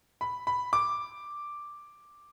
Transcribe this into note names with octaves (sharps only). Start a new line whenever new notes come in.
B5
B5
D6